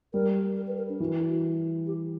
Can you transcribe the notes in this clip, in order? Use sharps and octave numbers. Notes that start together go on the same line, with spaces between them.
G3 A#4
A#4
B4
A#4
D4
E3 F#4
G4